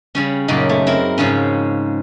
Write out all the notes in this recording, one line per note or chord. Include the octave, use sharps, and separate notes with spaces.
C#3 G3 C#4
F#2 A#2 C#3 D#4
A3
C4 E4 A#4
G#2 C#3 F3 C#4